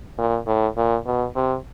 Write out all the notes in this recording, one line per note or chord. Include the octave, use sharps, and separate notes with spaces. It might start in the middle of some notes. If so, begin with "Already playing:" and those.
A#2
A2
A#2
B2
C3